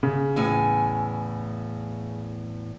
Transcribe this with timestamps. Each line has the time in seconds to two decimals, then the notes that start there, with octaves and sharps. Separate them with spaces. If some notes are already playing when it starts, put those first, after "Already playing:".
0.03 C#3
0.36 E2 A2 G#5